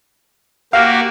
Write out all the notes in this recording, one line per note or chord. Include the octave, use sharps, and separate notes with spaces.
A#3 F#4 G4 F5